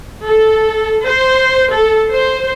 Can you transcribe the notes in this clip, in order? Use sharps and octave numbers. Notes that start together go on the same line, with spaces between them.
A4
C5
A4
C5